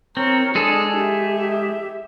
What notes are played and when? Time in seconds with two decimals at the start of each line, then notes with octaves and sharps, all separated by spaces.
0.17 C4 A#4 C#5
0.55 G#3 D4 G#4 A4
0.98 G4 E5